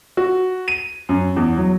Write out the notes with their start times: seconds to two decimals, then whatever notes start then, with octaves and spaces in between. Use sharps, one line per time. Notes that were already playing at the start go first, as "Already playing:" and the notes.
0.17 F#4
0.68 D#7
1.09 F#2
1.36 E2
1.57 F#3